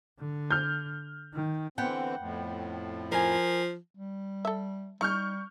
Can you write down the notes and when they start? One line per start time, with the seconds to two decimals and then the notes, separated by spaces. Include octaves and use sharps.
0.19 D3
0.51 F6 G6
1.34 D#3
1.78 D3 E3 B3 C4 F#5 G5
2.19 F2 A2
3.12 F3 A#4 G#5
3.96 G3
4.45 A4 E5
5.01 G3 D#4 C#6 F6 G6